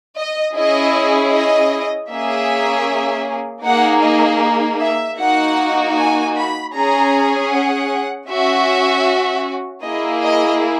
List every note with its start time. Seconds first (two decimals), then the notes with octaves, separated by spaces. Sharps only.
0.16 D#5
0.55 C#4 E4 G#4 D#5
1.32 D#5
2.10 A#3 C#4 G#4 E5
3.64 A#3 D#4 G#4 F#5
4.03 D#5
4.80 E5
5.19 A#3 D#4 F#4 F#5
5.97 G#5
6.36 B5
6.73 C#4 G#4 A#5
7.51 F#5
8.28 C#4 F#4 E5
9.83 A#3 E4 G#4 D#5
10.23 D#5